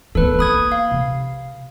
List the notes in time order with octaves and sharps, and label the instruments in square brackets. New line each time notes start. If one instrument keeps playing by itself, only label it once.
[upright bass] D#3 B3 [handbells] A4 B4
[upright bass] A#3 [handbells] B5 D#6 G#6
[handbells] F5
[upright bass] C3